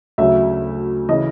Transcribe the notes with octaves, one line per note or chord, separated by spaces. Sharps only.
D2 C#3 F#3 E5
C#3 E3 D#5